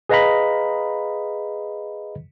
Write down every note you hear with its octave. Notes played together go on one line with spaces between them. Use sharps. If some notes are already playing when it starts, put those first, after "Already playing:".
G#4 B4 D#5 F5 A#5 B5